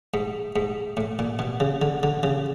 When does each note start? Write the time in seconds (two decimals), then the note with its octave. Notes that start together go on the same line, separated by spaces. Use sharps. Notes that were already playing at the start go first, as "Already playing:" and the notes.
0.14 G#2
0.56 G#2
0.97 A2
1.19 A#2
1.39 B2
1.60 C#3
1.82 D3
2.03 D3
2.23 C#3